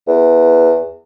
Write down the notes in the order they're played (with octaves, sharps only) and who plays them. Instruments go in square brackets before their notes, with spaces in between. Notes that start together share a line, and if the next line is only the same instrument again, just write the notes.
[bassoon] E2